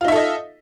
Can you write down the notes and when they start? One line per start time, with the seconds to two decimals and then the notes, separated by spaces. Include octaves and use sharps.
0.01 F4
0.05 D#4
0.08 E5
0.12 A4
0.16 D#5